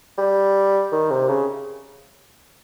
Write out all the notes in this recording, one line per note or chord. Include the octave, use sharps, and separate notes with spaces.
G3
D#3
C3
C#3